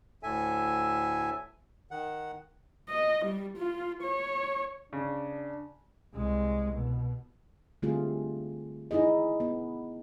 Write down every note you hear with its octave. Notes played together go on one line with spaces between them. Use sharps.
D2 A2 A4 E5 G#5
D#3 F#5
D#5
G3
F4
C#5
C#3 D4
C2 G#3
B2
D3 G3 A3 C4 F4 G#4
D#4 E4 G#4 D#5
B3